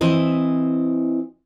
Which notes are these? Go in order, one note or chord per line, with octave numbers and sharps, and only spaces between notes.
E3 C4 E4 D#5